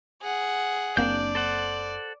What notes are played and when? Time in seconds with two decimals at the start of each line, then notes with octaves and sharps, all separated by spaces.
0.22 G#4 F#5
0.97 F#1 A#3 C4 D4 D5 G6
1.35 A4 C5 F#5